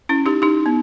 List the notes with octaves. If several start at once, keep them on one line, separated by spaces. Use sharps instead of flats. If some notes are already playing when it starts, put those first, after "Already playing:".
C#4 E4
D#4 G4
D#4 G4
B3